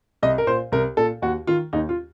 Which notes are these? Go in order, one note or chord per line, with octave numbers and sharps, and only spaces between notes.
C2 D#5
A#4
A#2 C5
C2 A#4
A#2 A4
D#2 F#4
D#3 F4
D#2 D#4
F4